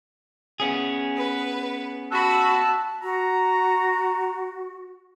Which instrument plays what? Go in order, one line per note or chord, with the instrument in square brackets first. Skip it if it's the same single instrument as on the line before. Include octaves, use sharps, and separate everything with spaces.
[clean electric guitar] B3 C#4 G#4
[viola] B4
[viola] F#4 B5 [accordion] A5 E6 F#6
[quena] F#4 [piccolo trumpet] A#5